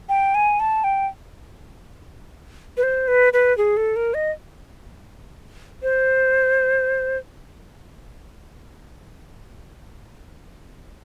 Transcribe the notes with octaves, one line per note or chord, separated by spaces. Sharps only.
G5
G#5
A5
G5
B4
C5
B4
B4
G#4
A4
A#4
D#5
C5